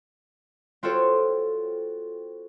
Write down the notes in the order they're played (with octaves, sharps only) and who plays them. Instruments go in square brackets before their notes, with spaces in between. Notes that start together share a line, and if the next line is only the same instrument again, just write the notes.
[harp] C4 F4 F#4 A4 C5 C#5